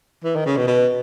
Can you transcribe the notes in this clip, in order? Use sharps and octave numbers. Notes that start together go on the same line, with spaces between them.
E3
D#3
C#3
B2
B2